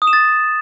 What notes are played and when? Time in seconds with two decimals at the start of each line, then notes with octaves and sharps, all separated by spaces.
0.02 D#6
0.07 E7
0.13 A6